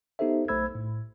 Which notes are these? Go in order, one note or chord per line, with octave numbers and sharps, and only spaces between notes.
B3 D#4 G4 A4 C5 E5
B1 A3 C5 B5 E6 G#6
A2